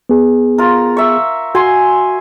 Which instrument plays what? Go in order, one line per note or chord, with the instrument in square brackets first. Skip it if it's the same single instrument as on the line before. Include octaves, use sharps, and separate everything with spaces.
[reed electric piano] B3 G#4
[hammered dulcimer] F4 A#4
E5 C#6
[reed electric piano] F#4 [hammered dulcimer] G#5 C6